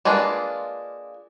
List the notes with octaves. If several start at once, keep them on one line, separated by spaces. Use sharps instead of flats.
G#3 A#3 D4 F4 B4